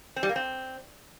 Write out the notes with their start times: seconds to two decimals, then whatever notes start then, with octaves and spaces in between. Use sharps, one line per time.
0.16 C4
0.23 G3
0.29 A#3
0.36 C4